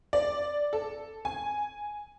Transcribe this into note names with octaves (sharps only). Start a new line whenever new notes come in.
D5
A4
G#5